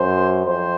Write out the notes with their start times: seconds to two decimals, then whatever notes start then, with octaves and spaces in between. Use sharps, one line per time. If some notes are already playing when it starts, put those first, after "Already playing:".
Already playing: F#2 C5
0.46 F2 C5